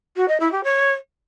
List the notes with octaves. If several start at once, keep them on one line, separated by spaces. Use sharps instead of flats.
F#4
D#5
E4
G4
C#5